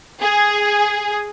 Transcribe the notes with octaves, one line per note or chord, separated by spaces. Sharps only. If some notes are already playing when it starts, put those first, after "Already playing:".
G#4